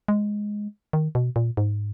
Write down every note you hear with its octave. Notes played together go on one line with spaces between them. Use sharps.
G#3
D#3
B2
A#2
G#2